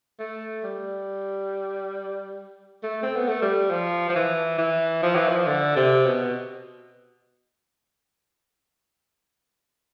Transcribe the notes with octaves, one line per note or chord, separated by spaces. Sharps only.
A3
G3
A3
C4
B3
A3
G3
F3
F3
E3
E3
F3
E3
F3
D3
C3
B2